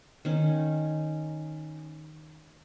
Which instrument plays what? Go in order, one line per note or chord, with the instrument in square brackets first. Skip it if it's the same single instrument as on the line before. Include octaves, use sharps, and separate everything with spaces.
[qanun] D#3 C#4